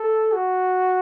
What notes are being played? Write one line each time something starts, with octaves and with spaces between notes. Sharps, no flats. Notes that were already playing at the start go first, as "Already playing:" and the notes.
Already playing: A4
F#4